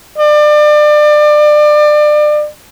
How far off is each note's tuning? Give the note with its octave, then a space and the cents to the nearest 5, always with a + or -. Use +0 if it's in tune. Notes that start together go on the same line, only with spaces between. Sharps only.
D5 +30